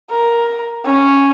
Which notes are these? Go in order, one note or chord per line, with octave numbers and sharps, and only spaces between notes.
A#4
C#4